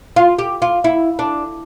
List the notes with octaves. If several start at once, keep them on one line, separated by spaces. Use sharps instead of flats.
F4
G4
F4
E4
D4